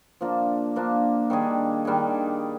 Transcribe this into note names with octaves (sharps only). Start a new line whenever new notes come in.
F3 A#3 D4
F3 A#3 D4
D#3 G3 D4 G#4
D#3 G3 D4 G#4